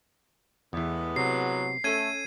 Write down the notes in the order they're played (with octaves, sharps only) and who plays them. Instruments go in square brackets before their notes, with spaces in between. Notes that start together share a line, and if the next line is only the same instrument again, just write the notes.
[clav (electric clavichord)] E2 E3 [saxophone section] A2 G#3 B3
[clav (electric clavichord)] C3 [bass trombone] F#3 [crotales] C7
[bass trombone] A3 [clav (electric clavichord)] C#4 A4 [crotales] G#6 D#7